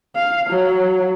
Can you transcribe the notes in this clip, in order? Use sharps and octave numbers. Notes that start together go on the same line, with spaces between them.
F5
F#3